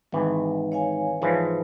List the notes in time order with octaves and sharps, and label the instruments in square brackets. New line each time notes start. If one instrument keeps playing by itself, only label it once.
[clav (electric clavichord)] G#1 E3 [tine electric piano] G#3 D#4
[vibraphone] C#5 F5 G#5
[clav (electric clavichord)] G#2 E3 F3